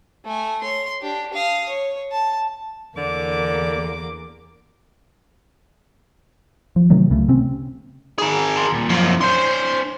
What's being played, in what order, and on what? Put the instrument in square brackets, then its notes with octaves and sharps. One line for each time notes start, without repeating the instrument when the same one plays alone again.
[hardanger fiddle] A3 G#5
C#5 C6
D4 G4
F5 D#6
C#5
A5
[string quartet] E2 A#3 D6 [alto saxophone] D3
[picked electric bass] F3
C3 D#3 F#3 A3
C#2 C#3 A3
C3 C4 C#4
[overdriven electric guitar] G#4 A#4
[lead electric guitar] A5 C6
D#2 A#2
[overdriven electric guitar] F#2 F3 [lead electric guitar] A#3 F4
[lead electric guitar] D4 C#5 [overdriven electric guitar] C5 C6